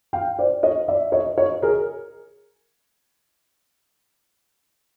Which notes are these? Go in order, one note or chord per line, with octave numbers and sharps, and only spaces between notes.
F5 G5
C5 D5
C#5 D#5
D5 E5
C#5 D#5
C#5 D#5
G#4 A#4